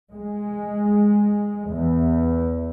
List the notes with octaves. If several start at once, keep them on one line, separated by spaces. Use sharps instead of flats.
G#3
E2